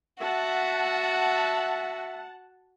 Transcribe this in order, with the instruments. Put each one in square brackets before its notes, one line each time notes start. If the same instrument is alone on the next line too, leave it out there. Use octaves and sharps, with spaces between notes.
[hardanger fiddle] F#4 [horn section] E5 [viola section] F#5 A5